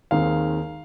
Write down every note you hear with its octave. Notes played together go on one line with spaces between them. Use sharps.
D#2 D#3 G#3 C4 F5